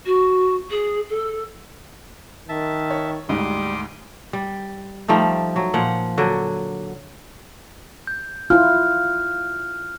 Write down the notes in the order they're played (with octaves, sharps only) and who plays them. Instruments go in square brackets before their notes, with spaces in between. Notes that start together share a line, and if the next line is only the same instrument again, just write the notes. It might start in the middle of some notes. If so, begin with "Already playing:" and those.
[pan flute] F#4
G#4
A4
[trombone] D#3 [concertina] E5 A5
[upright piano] C#5
[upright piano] D2 G#2 [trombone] G3 [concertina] C6 D6 D#6
[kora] G3
F3 G3 A3 D#4
F#3
A#2 F3 F#5
D3 F#3
[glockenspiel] G6
[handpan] E4 F4 [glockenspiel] F6